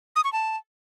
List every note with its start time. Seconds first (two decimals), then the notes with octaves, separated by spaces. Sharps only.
0.16 D#6
0.24 C#6
0.33 A5